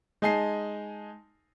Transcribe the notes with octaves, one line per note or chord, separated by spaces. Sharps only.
G#3 D#4 G#5 A5 C7